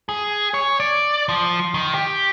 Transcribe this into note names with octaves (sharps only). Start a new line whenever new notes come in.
G#4
C#5
D5
F3
D#3
G4